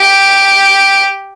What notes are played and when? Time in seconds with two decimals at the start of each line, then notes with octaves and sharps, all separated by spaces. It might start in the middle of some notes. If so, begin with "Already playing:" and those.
Already playing: G4